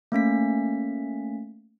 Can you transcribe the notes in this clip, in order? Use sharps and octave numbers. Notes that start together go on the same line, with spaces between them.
A3 A#3 C#4 B6